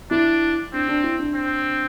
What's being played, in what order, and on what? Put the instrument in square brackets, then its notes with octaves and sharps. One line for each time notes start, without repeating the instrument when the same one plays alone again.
[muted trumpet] D4 [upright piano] E4
[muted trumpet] C4 [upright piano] D4
[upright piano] D4
E4
D4
[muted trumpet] C4